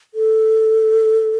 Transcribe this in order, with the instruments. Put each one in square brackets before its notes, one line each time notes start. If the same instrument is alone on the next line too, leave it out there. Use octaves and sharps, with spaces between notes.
[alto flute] A4